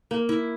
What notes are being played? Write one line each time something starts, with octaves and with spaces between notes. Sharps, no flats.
A#3
E4